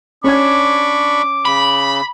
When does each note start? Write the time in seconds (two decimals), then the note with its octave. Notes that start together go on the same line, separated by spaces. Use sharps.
0.24 C#4 D4 B5 C#6 D6 G#6
1.45 C#3 B5